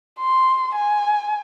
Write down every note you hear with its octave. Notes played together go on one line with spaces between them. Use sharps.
C6
G#5